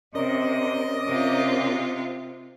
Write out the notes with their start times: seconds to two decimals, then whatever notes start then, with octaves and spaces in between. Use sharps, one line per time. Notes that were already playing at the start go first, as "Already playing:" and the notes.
0.15 C3 C#4 A#4 D5 D#5
1.08 C3 F4